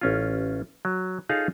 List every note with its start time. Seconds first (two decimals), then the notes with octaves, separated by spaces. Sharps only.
0.01 A1 C#4 F4
0.85 F#3
1.29 D#4 F4 G#4 A4 C#5 F5